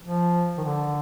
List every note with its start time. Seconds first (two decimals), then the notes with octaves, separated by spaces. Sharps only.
0.03 F3
0.58 D#3
0.64 D3